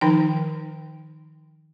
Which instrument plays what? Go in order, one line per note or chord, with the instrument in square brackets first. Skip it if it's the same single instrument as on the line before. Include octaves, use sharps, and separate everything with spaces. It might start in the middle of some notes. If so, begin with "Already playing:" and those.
[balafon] D#3 F3 D#4 G5